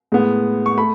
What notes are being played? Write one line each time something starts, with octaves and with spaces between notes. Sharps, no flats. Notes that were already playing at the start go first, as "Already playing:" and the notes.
A2 G#3 B3
C#6
A3 B5